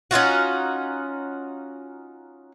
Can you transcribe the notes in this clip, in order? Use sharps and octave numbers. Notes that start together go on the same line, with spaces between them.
C#4 D#4 F4 F#4